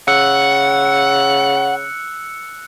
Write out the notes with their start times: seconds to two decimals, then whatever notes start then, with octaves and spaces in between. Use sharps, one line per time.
0.08 C#3 F#5 E6 F#6 C#7